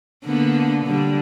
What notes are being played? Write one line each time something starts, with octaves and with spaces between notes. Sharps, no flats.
D3 A#3 B3
D3 G3